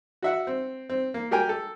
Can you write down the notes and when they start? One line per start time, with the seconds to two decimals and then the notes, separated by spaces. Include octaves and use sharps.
0.22 F#4 E5 F#5
0.47 C4
0.90 C4
1.14 A#3
1.31 F#4 G4 A#4 G5 G#5
1.49 A4